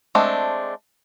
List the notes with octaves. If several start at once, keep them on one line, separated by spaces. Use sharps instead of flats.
G#3 A3 C4 D4